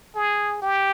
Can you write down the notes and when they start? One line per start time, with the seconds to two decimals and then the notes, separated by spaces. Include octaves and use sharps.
0.15 G#4
0.62 G4